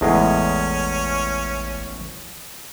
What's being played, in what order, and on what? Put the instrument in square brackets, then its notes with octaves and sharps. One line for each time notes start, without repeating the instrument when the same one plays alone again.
[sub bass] A1 [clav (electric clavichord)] E2 A2 G#3 [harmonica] C#4